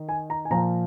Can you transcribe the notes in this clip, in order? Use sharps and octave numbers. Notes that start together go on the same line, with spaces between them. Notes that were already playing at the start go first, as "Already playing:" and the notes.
Already playing: D#3
G#5
A#5
G#5
A#2 F3 A#5